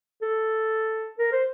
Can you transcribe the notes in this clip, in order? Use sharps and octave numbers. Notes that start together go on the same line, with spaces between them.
A4
A#4
C5